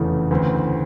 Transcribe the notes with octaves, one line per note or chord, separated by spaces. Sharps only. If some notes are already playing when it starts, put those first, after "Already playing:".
Already playing: F1 E2 C#3 E3 A3
D2 C#3 E3 A3 C4